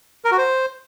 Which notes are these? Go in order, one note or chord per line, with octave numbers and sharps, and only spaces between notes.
A#4
F#4
C5